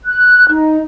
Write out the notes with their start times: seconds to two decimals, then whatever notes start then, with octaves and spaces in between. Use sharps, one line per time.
0.06 F#6
0.49 D#4